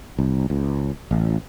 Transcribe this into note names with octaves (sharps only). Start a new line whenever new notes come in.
C2
C#2
A1